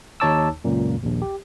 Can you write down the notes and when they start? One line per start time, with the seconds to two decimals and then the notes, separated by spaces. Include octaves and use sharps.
0.20 D#2 D#4 C#5 A5 D6 E6
0.64 C#2 F#2 A#2
1.04 A#1 D#2
1.22 G4